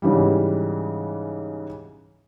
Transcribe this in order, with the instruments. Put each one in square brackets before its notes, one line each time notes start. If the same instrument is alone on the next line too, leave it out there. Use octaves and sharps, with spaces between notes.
[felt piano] G#2 C#3 E3 G3